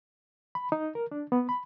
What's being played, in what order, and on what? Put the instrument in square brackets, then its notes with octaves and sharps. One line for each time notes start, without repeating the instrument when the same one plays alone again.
[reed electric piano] B5
D#4
A#4
D4
B3
B5